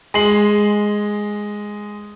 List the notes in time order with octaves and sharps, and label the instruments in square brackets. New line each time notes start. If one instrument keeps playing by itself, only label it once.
[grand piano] G#3 G#5 C6 C7 F#7